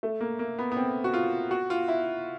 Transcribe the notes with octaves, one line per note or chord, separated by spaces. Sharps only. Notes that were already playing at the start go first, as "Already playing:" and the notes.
A3
A#3
A#3
B3
B3
C4
F#4
F4
F#4
F4
E4